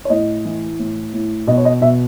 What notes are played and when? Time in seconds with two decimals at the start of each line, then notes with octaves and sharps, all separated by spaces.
0.05 C#5
0.10 A2 D#5
0.45 E3
0.79 A2
1.13 A2
1.47 B2 D#5
1.58 C#5
1.65 D#5
1.81 B2 E5